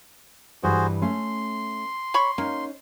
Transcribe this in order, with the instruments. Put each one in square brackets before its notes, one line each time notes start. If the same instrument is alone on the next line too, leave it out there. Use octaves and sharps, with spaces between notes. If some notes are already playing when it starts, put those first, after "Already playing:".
[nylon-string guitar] G2 E3 G3 [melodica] F#4 G#4 C5
[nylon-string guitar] A3 C#4 [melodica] C6
[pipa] C#5 B5 C#6
[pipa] A#3 [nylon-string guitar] C#4 D#4